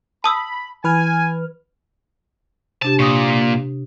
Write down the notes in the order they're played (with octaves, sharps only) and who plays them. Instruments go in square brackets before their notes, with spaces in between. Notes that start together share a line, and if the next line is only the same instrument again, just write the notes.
[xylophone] A5 D#6 E6 [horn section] B5
[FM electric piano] E3 B4 F6 [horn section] G#5
[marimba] C3 D4 G4 [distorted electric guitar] A5
[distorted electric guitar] A#2 [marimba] C#6 D#6